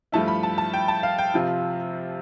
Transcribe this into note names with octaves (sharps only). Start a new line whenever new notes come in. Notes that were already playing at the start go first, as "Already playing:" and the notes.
G2 F3 A3 E4 A5
B5
A5
A5
G5
A5
F5
G5
C3 F3 C4 F4